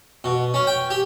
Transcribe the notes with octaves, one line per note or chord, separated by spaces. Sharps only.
B2
C#4
G5
G4